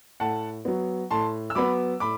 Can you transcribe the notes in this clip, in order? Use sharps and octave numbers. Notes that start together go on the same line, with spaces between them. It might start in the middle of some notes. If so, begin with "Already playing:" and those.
A2 F#5 A5
F#3 B3
A2 A5 C6
E6
F#3 B3 B5 D6
A2 B5 D6